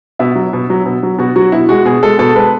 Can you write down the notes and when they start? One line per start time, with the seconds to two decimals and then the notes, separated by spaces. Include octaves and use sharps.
0.19 B2 E5
0.35 F#3
0.53 B2
0.70 F#3
0.86 B2
1.03 F#3
1.18 B2 F#4
1.36 F#3 F#4
1.52 B2 E4
1.69 G#3 F#4
1.85 B2 G#4
2.03 G#3 A4
2.19 B2 A4
2.35 G#3 B4